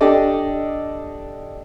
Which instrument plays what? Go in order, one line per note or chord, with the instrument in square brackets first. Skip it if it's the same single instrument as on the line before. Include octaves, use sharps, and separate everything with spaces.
[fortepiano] D4 G4 A4 D5 D#5